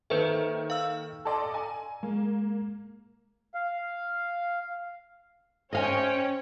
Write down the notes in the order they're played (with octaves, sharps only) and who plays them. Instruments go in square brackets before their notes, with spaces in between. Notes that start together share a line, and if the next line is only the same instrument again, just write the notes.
[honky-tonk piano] D#3 A#3 [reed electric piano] A4 G6 [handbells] B4 C5 E5
[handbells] F5 E6
[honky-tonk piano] A4 D5 D#5 [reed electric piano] A5 C6
[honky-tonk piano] G#5 [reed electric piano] A#5
[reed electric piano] G#3 [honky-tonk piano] A#3
[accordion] F5
[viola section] C#4 C#5 [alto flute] C5 [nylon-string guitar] D#5 F5 G#5 [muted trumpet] G5